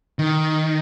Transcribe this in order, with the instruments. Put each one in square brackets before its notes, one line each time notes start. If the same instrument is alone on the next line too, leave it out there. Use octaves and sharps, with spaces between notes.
[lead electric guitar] D#3